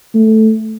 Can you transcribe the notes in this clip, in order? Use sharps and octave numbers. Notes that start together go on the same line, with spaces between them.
A3